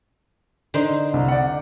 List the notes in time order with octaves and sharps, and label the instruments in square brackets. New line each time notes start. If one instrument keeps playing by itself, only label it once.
[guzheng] D3 D#4 C5
[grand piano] C2
D5 F#5